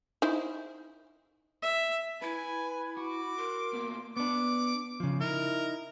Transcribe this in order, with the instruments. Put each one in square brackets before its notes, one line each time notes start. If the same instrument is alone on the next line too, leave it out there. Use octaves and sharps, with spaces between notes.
[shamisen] D#4 E4 C5
[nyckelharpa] E5
[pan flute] E4 [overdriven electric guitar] B4 [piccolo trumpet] G#5 [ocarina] B5
[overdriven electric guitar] F#4 [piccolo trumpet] D6
[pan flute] A#4 [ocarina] C6
[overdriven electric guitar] B2 A#3
[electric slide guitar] B3 D4 [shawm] D6
[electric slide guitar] C#3 F3
[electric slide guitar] D#4 E4 [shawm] A#4